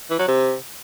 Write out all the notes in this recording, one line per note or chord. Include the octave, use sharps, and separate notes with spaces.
E3
F#3
C3